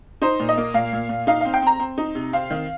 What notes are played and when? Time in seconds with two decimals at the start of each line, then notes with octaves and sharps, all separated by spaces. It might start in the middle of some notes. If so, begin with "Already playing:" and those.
0.22 D#4 C5
0.40 A#2
0.49 D#5
0.58 A#3
0.74 A#2 F5
0.93 A#2
1.09 A#2
1.27 D#4 F5
1.41 C4 F5
1.54 G5
1.62 C4 A#5
1.80 C4
1.98 D#4
2.15 C3
2.33 C4 F5
2.50 D#3